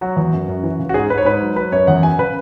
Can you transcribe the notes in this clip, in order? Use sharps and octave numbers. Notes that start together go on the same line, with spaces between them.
F#3 F#4
E2
F#2
F#2
E3
C#3
F#4
G#2 G#4
G#2 B4
C#5
G#2 B4
F#3
F#3 B4
F#2 C#5
E2 F#5
F#3 G#5
C#3 B4